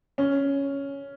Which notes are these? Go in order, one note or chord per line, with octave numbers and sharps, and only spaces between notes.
C#4